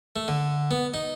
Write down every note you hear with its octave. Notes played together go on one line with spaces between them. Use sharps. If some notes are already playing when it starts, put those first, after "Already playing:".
A3
D3
B3
D#4